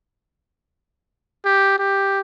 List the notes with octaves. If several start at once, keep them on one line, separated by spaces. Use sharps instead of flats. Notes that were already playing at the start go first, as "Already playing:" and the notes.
G4
G4